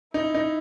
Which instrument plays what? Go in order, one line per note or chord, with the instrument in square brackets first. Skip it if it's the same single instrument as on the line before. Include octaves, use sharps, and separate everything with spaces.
[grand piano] D#4 [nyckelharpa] E4
[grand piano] D#4